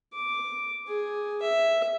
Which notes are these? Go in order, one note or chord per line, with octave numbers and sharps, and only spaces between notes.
D6
G#4
E5